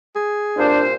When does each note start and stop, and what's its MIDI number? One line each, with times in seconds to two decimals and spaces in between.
0.16 0.70 68
0.57 0.94 36
0.57 0.94 46
0.57 0.85 62
0.57 0.94 72